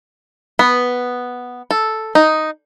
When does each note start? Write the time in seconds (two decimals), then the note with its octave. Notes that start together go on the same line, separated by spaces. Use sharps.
0.59 B3
1.71 A4
2.15 D#4